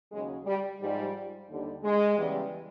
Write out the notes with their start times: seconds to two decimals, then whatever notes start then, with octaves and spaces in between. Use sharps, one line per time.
0.11 D#2 C#3 F#3 G#3
0.45 G3
0.80 G#2 F3 G3
1.48 D#2 D3 G3
1.82 G#3
2.17 E2 C#3 E3 G3